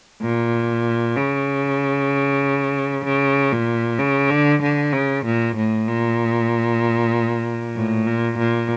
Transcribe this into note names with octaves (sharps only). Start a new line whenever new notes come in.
A#2
C#3
C#3
A#2
C#3
D3
D3
C#3
A#2
A2
A#2
A2
A#2
A#2